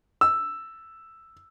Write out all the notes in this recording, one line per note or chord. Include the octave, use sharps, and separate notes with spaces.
E6